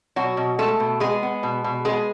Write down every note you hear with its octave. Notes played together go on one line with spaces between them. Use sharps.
B2 F#3 F#4
B2
G#3 A3 A4
B2
G#3 B3 G#4
B3
B2
B2
G#3 B3 G#4